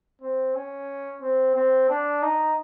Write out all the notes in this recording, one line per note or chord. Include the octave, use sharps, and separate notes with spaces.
C4
C#4
C4
C4
D4
D#4